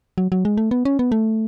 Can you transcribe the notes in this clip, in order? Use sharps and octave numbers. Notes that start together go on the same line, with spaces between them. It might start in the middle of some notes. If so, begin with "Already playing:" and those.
F#3
F#3
G#3
A3
B3
C#4
B3
A3